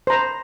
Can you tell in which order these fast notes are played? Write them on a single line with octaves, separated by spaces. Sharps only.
C5 A#5 B5